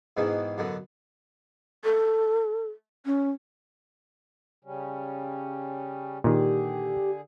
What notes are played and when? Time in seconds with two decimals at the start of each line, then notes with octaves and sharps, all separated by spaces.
0.17 G#2 B2 D#3 E3
0.58 F#2 B2 D3
1.84 A4
3.06 C#4
4.65 C#3 G3 C#4
6.24 A#2 D3 D#3 G4 G#4